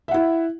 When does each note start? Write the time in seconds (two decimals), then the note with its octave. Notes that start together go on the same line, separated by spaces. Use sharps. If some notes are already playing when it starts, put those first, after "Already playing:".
0.08 E5
0.11 F#5
0.14 E4